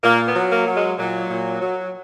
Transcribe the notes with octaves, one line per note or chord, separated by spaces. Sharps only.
A#2 A#3
B3
F#3
A#3
F#3
G#3
A#2 F#3
A#2
F#3